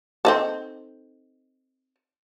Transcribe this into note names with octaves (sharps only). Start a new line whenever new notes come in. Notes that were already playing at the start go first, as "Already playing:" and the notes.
C4 D#4 A4